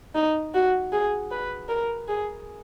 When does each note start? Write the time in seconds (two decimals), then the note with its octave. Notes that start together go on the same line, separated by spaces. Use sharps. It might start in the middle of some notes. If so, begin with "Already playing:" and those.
0.15 D#4
0.54 F#4
0.92 G#4
1.31 B4
1.69 A#4
2.08 G#4